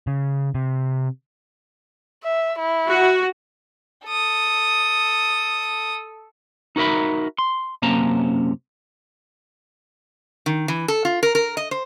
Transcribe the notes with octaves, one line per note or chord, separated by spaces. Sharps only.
C#3
C3
E5
E4
F#4
A4 D#6
D#4 F#4 A#4 E5 B5
C6
F#2 C3 A#3 C#4 A5 A#5
D#3
E3
A4
F4
A#4
A#4
D#5
C5